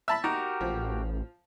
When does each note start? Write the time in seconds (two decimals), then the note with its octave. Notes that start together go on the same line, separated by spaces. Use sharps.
0.08 E5 A5 B5
0.24 D#4 F#4 G4 A#4
0.61 A1 F3